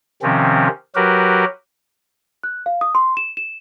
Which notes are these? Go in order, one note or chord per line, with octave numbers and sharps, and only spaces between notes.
C3 D#3 F3 C4 C#4
F#3 F#4 G4 A#4 B4
F#6
F5
D#6
C6
E7
E7